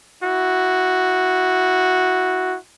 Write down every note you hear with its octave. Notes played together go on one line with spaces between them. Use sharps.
E4 F#4